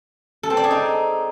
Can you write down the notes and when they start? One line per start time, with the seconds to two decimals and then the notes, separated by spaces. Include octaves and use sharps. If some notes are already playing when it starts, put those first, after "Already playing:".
0.43 A4
0.50 C4
0.57 D5
0.64 G#4
0.71 D#4